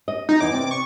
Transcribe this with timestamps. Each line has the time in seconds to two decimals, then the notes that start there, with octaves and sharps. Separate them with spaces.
0.08 D#5
0.29 D#4
0.41 E2 E3 D6
0.52 C3 C4 D5
0.71 C#6